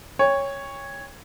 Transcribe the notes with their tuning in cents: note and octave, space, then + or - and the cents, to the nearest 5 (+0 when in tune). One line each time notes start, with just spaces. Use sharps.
C#5 +0 G5 +40